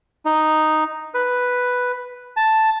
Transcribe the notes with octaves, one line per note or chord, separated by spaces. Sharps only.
D#4
B4
A5